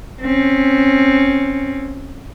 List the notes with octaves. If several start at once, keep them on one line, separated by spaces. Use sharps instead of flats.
C4 C#4